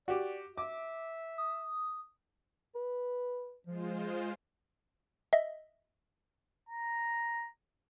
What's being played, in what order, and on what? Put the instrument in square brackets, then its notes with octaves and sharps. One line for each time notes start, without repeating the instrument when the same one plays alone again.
[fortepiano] F#4 G4 [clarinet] D5
[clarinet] E5 [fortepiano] D6
[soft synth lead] D#6
[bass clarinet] B4
[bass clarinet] F3 [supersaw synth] G#3 F4 C5
[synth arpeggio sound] D#5 E5
[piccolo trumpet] A#5